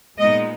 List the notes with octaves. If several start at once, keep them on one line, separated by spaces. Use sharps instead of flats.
A#2 G#3 B3 D#4 D#5